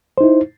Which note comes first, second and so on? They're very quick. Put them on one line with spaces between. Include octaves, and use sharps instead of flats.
C5 D#4 E4